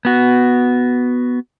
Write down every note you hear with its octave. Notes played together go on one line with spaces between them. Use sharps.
B3 F#4